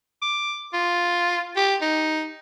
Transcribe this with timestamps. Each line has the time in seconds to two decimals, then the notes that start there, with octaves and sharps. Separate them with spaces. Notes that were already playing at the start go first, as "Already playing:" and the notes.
0.22 D6
0.73 F4
1.56 G4
1.81 D#4